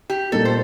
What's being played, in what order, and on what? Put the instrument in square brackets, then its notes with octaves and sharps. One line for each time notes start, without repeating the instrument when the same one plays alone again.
[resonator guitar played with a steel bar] G4
[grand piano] A#2 G3 A#3 D#4 G4 [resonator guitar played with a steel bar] A4
[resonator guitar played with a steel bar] C5